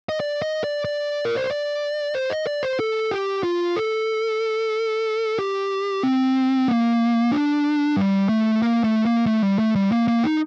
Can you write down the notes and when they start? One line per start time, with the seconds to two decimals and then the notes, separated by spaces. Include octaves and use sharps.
0.09 D#5
0.20 D5
0.42 D#5
0.64 D5
0.85 D5
1.25 A#4
1.37 C5
1.50 D5
2.15 C5
2.30 D#5
2.47 D5
2.63 C5
2.80 A4
3.11 G4
3.43 F4
3.76 A4
5.39 G4
6.03 C4
6.68 A#3
7.32 D4
7.97 G3
8.29 A3
8.62 A#3
8.84 A3
9.05 A#3
9.26 A3
9.43 G3
9.59 A3
9.75 G3
9.92 A#3
10.08 A#3
10.24 D#4